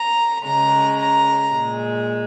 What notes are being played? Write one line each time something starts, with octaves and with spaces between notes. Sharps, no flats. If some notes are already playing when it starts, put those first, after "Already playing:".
Already playing: A#5
C#3 G#3 A#5
A#5
A#2 G#3